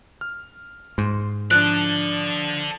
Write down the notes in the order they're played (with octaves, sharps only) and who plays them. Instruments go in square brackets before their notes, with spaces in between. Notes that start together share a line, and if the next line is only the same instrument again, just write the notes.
[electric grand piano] F6
[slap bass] G#2 [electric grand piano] C6
[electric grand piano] F3 D4 [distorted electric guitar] A4 D5 [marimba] F#6